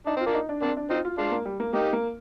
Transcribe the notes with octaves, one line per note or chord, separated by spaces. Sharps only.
D4 D#4
C4 F4
A#3 D4
D#4
D4
A#3 C4 D4
D4
C4 D#4 F4
F4
G#3 D4 F4
A#3
G3
A#3
A#3 D#4 G4
A#3